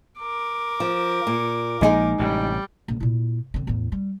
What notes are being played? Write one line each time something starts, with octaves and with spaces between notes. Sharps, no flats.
A#4 D6
F3
A#2
A#1 F3 G#3 A#3 D#4 G#4
A1 A2 C3 G3
A#1
A#2 E4
D3 C4
E2 A2
G3